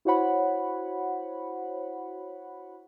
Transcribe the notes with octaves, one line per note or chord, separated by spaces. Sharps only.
E4 F#4 C5 C#5 F#5 B5